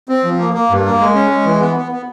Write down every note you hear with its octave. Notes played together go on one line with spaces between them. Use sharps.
C4
F3
A#3
A#3
G2
A#3
G#3
C#4
G#3
E3
B3
B3
B3